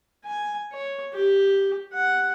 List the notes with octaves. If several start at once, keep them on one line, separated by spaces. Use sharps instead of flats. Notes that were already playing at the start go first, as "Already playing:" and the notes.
G#5
C#5
G4
F#5